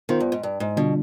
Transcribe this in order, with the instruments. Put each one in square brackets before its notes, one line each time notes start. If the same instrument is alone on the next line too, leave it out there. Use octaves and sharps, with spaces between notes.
[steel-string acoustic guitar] D#3 [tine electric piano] B3 F4 C5
[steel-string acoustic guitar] G2
G#2
G2
G#2
[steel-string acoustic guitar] B2 [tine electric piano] D3 G3 D4 F4